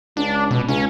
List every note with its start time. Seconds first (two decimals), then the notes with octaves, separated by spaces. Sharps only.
0.17 C#2 D4
0.51 B2
0.68 C#2 C#4